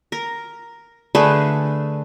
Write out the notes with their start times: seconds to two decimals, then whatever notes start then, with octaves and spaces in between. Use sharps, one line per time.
0.12 A#4
1.15 D3 A3 G#4 B4